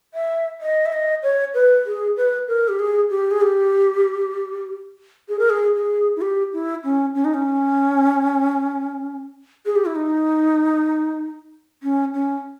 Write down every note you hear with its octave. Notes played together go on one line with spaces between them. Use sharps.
E5
D#5
E5
D#5
C#5
B4
G#4
B4
A#4
G4
G#4
G4
G#4
G4
G#4
A#4
G#4
G#4
E4
G4
E4
C#4
C#4
D#4
C#4
G#4
G4
E4
D#4
C#4
C#4